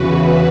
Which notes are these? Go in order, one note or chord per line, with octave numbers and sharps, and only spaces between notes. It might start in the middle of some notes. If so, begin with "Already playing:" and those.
Already playing: E2 C#3 E3 F#4 B4